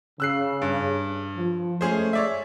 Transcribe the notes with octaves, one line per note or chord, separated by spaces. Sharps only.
C#3 E6 F#6 C7
G2
F3
G#3 A3 C#4 G#4 C5
C#5 D5 E5